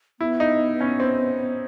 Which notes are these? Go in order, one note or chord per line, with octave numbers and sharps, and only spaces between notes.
B3 E4
D#4
C#4
C4